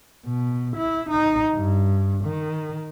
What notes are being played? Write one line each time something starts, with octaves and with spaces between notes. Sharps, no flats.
B2
E4
D#4
G2
D#3